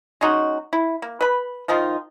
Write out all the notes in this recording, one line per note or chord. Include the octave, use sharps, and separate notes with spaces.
G#3 C#4 D#4 F#4
E4
A#3
B4 B5
D#3 F3 D#4 F4